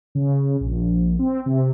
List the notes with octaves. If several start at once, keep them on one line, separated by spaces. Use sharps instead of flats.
C#3
A#1
C4
C3